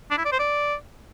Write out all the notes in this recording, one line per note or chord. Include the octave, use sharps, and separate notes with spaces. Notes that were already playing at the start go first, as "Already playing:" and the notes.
D4
E4
D5
C5
D5